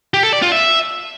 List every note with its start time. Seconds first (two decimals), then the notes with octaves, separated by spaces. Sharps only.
0.14 G4
0.23 A4
0.33 D5
0.42 F4
0.52 E5